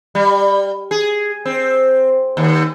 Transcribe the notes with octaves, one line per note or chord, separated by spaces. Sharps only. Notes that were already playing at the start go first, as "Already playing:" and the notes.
G3
G#4
C4
D#2